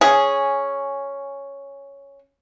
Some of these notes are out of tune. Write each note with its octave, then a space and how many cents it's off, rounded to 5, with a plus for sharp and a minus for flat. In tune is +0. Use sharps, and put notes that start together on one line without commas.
C#4 +0 G#4 +0